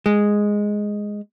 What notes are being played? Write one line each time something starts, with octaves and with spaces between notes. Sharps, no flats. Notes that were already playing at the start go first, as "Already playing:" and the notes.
G#3